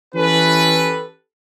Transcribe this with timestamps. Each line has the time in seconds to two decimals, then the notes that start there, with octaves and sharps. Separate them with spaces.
0.15 E3 C#4 G4 A4 B4